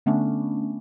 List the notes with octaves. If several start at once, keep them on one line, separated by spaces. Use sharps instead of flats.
D3 A3 B3 C#4 D4